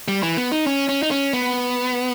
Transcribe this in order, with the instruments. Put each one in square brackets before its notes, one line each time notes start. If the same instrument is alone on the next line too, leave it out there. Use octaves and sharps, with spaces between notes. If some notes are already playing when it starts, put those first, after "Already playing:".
[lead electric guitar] G3
E3
B3
D#4
C#4
C#4
D#4
C#4
B3